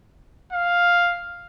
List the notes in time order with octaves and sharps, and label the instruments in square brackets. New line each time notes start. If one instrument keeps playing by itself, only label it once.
[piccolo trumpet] F5